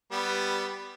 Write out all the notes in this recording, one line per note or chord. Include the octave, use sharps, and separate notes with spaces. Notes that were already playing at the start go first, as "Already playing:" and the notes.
G3 B3